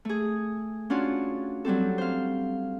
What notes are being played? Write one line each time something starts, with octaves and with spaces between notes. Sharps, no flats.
A3 G#4
C#4 D4 F4 F#4
F#3 G3 C4 A4
C5 F5